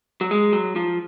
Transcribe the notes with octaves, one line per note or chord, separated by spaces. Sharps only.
F#3
G#3
F#3
F3